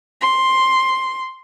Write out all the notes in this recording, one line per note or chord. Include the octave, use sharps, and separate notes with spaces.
C6